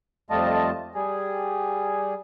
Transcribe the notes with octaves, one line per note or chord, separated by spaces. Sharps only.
F2 G3 A3 F4 D#5 A5
G3 G#4